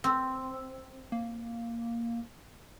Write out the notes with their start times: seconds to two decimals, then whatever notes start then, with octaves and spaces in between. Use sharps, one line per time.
0.04 C4
1.12 A#3